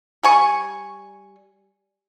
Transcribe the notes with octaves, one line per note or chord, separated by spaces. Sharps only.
G3 G#5 C#6